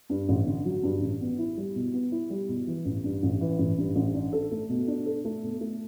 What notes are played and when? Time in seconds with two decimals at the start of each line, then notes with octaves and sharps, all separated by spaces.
0.10 G2
0.29 A1
0.46 D3
0.65 F#3
0.83 G2
1.02 A1
1.21 B3
1.38 E4
1.57 G3
1.75 B2
1.94 B3
2.12 E4
2.30 G3
2.49 B2
2.67 E3
2.85 A1
3.04 G2
3.23 A1
3.41 E3
3.59 A1
3.78 G2
3.96 A1
4.14 D4
4.33 A4
4.51 A3
4.69 B2
4.88 D4
5.06 A4
5.25 A3
5.43 B2
5.61 A3